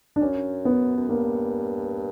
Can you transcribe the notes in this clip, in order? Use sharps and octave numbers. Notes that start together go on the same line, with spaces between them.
D4
F#2 C#4
B3
F#2
G2 A#3